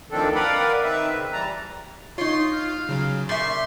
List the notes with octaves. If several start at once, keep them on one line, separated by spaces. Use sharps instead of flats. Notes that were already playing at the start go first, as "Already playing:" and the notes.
D2 D#3 F3 C4 D4 A4
A#4 B4 D5 F5 F#5 B5
D#3 C4 B4 E5
C#3
E3 G3 A5 A#5
D#4 F4 C#5 C6
F5
C#3 F#3
A#2 E5 C6 C#6